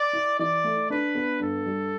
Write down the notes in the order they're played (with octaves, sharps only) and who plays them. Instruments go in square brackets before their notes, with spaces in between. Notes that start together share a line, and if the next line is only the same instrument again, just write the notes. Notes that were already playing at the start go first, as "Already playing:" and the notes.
Already playing: [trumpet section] D5
[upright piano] E4
[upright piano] E3 [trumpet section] D5
[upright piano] A3
[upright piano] D4 [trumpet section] B4
[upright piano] B3
[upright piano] G2 [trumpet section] A4
[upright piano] G3